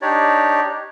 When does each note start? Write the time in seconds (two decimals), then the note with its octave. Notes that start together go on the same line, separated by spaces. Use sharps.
0.02 D4 D#4 G4 C#5 D5